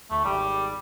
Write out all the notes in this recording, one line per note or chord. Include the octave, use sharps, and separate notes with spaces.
D2 A3
G#1 G3